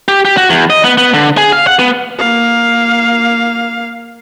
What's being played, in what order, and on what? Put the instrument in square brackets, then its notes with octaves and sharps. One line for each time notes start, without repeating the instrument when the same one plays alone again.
[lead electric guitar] G4
G4
F#4
E2
D#5
B3
B3
D3
G#4
F5
F#5
B3
[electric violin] A#3 F5